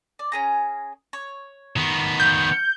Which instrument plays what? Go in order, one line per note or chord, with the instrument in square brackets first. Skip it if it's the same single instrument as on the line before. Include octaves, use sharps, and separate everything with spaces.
[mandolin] D5
C#4 G#4 A#5
C#5
[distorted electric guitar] D#3 B3
[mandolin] F5 [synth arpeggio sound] G6